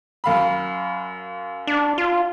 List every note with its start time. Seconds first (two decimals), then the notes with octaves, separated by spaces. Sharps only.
0.24 F#2 F5 B5
1.67 D4
1.98 F4